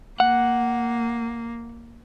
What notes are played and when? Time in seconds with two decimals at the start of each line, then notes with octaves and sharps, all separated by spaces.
0.20 A#3 F#5